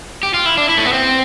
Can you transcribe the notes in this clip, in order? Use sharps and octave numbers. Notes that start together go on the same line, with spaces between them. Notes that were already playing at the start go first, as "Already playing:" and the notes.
G4
F4
E4
D4
E4
A3
B3
C4